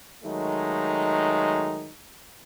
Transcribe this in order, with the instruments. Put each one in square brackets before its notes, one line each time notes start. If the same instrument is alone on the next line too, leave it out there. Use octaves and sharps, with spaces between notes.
[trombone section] D#3 F#3 G#3 A3 D#4